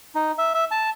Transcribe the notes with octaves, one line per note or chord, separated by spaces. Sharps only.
D#4
E5
E5
A5